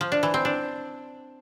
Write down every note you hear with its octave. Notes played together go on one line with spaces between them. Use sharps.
F3
D4
E3
C4
D4